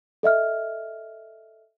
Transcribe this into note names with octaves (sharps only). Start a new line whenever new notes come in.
A4 D#5 E5 F6